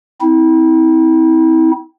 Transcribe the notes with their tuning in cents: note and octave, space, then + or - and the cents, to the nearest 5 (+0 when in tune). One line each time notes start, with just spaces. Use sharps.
C4 -20 E4 -35